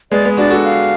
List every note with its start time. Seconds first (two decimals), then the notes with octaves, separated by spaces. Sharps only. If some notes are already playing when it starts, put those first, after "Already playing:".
0.11 G#3 B3 D5
0.25 G#3 B3
0.37 D4 F#4 D5
0.50 F#4 A4
0.64 F5